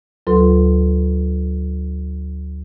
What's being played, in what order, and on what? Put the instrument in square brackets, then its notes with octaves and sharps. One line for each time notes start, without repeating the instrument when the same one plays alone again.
[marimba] D2 F#3 F4 A4 B4 C6